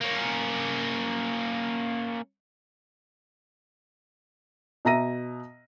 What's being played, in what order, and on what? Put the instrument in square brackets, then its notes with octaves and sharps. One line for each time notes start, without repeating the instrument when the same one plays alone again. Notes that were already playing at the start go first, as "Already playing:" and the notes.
[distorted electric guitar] A#3 C#4
[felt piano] B2 E5 A#5 A#6 D#7